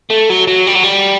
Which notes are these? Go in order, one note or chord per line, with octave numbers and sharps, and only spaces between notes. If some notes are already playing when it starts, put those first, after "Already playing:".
A3
F#3
F#3
G3
F#3
G3